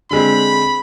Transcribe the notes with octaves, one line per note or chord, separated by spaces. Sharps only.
D3 G#3 C4 B5